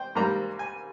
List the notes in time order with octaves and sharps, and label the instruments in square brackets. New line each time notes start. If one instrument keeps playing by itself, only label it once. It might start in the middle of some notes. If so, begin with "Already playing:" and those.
Already playing: [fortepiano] C5 G5
G#2 G3 A#3 A#5
G#5